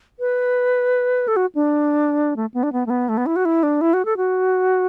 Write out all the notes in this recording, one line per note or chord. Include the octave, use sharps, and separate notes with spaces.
B4
A4
F#4
D4
A3
B3
D4
B3
A3
B3
A3
B3
E4
F#4
E4
D4
E4
F#4
A4
F#4